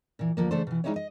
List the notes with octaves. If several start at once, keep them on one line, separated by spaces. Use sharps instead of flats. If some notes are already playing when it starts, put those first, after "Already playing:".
A#2 E3
D2 F3 A#3
C#3 E3 A3 D4 A4 C5
B2 E3
G3 G#3 D#4 E4 G4 C#5
D#5